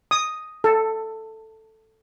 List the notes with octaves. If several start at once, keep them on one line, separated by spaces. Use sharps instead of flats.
D#6
A4